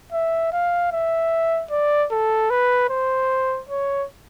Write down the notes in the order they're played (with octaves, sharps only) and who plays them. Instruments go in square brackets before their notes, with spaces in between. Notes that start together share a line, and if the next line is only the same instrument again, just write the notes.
[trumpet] E5
F5
E5
D5
A4
B4
C5
C#5